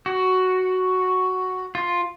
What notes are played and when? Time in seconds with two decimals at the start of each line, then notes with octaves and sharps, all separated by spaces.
0.06 F#4
1.75 F4